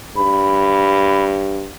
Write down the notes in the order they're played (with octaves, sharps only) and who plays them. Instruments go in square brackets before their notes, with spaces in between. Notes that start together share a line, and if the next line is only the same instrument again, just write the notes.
[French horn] G2 [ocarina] B5